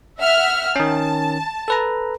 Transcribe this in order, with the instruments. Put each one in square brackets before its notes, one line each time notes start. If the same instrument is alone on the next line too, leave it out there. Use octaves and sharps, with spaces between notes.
[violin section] E5 F#5 F6
[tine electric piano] D#3 C#4 [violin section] A5
[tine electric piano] A4 B4 A#5